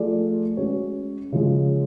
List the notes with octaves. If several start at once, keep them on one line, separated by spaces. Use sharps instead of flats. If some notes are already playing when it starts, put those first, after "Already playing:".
Already playing: F3 A3 F4 G#4 D5
G#3 C#4 F#4 C#5
C#3 F3 G#3